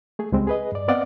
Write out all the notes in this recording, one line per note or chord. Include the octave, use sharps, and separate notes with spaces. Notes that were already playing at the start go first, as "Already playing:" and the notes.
A3 G#4
C#2 G3 G#3 C4
G#4 B4 D#5
G2 D5
B3 C4 D5 D#5 F5 F#5